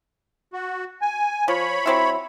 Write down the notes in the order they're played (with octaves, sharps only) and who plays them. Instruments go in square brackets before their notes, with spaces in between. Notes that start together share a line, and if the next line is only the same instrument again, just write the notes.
[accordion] F#4
G#5
[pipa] F3 [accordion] C#5 B5
[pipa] F#3 C4 E4